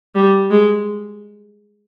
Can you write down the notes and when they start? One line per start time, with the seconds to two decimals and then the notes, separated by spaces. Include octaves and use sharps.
0.15 G3
0.51 G#3